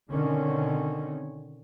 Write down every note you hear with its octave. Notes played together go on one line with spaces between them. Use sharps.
B2 D3 D#3 C4 C#4